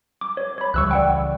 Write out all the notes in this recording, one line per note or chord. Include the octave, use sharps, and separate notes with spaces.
D6
C#5
C#5 B5
C#2 E3 G3 C#6 E6 F#6
D5 F#5 G5